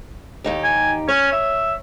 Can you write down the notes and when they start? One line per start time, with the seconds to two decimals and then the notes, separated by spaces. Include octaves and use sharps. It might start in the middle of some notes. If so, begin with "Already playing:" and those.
0.44 D#2 D#4 G4
0.64 G#5
1.08 C#4 C#5
1.33 E5